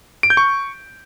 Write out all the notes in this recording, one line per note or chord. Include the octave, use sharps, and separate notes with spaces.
D7
G6
C#6